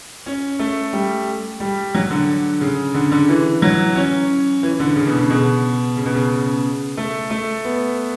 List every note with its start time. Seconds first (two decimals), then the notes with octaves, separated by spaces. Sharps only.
0.26 C#4
0.59 A3
0.93 G3
1.60 G3
1.95 F#3
2.10 D3
2.61 C#3
2.94 D3
3.11 D3
3.29 E3
3.62 F#3
3.96 C#4
4.63 E3
4.80 D3
4.96 C#3
5.07 B2
5.18 C#3
5.30 B2
5.97 C#3
6.06 B2
6.14 C#3
6.30 C#3
6.97 A3
7.30 A3
7.65 B3